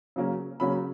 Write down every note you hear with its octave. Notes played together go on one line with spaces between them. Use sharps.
C#3 F#3 A#3 C#4
C#3 F#3 A#3 C#4 B5